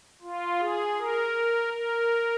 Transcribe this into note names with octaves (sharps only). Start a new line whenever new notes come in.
F4
G#4
A#4
A#4